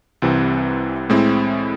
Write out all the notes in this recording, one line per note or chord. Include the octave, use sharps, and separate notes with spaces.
C2 C3 E3 C4
A2 G#3 C4 E4